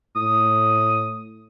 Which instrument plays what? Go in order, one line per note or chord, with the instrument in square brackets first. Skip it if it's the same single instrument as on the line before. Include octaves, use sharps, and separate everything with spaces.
[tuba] A2 [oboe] D#6